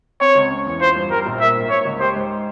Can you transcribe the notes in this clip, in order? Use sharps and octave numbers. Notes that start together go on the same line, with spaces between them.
C4 C#5
C#2
C#4
E2
F4 C5
G2
G3 A#4
A#1
A#3 E5
G#1
A#3 C#5
C#2
G4 C5
G#2